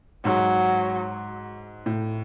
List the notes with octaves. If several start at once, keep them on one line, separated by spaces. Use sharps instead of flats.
G#2 F#3
A2